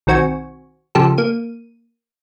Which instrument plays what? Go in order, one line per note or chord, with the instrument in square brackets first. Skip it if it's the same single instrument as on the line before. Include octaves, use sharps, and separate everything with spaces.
[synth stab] B1 D#3 C4 F#4 G#5 C#6
C#3 F3 G4 A4
A#3 D#7